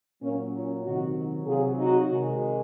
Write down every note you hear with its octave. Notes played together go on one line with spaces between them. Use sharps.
A#2 F#3 A#3 C#4
C#4 F4
C3 D#3 F#3 D#4 F#4
C3 F#3 F4 G#4
D#4 F#4
C3 D#3 G#3